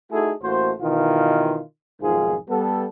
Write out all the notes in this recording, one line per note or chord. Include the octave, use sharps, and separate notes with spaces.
A3 D#4 E4 F#4 G#4 A4
A1 A3 A#3 F#4 C5
B2 D#3 E3 E4 F4
B1 F2 G#2 D#3 F4 G#4
G3 B3 A4